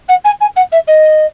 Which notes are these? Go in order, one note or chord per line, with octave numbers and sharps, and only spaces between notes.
F#5
G#5
G#5
F#5
E5
D#5